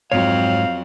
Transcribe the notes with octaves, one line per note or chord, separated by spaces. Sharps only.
F2 G#2 F#3 C4 C#5 F5